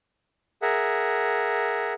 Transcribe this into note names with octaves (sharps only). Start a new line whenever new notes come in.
G#4 A#4 E5 F#5